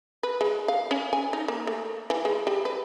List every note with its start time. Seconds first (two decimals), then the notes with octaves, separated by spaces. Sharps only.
0.23 B4
0.41 G#3
0.68 F5
0.91 C#4
1.13 G#5
1.33 D#4
1.48 A#3
1.67 A3
2.10 E3
2.25 G#3
2.47 G3
2.65 B4